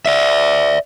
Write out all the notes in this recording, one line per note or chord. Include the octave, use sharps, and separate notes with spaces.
D5 E5